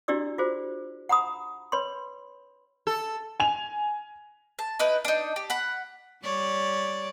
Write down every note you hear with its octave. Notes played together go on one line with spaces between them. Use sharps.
D4 E4 F#4 G4 D5 E6
F4 F#4 G#4 C5
F#5 A#5 B5 D#6
B4 C#5 B5 C6
A4
G#5 F7
A5
D#4 E4 B4
D4 D#4
G4
F#5 B5
G3 C#5 D5